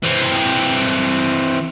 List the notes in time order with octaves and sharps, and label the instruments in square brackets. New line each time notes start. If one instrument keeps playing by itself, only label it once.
[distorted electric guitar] E3 C4